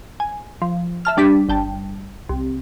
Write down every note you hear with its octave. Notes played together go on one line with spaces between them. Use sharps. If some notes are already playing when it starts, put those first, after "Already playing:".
G#5
F3
E5 A5 F6
G3 D4 G4 B6
G1 G5 A5
C2